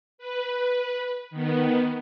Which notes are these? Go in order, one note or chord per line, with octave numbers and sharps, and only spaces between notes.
B4
D#3 B3